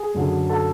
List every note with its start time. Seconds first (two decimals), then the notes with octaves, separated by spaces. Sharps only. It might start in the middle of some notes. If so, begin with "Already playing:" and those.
Already playing: G#4 G#5
0.14 F#2 D3 F#3
0.49 A4 A5